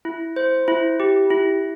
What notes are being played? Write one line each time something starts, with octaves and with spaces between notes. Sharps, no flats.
E4
C5
E4
G4
E4